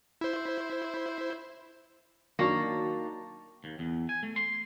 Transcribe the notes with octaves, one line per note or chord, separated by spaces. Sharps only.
E4 C5
D#3 F#3 A#3 D4 A5 C#6 A#6
D#2
E2
G#5
A3
C6